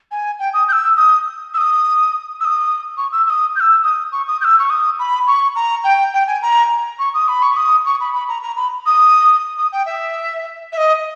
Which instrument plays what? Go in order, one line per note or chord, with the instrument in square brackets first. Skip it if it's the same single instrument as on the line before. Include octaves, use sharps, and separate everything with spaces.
[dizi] G#5
G5
D#6
G6
E6
D#6
E6
D#6
E6
D#6
C#6
E6
E6
D#6
G6
E6
D#6
C#6
D#6
G6
E6
C#6
D#6
B5
C#6
A#5
G5
G5
G#5
A#5
C#6
D#6
B5
C#6
D#6
C#6
B5
B5
A#5
A#5
B5
D#6
D#6
G5
E5
E5
D#5